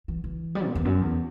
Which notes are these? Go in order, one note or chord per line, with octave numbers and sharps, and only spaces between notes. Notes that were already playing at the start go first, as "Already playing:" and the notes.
E3
E3
G3
A#2
E2
F#2
E2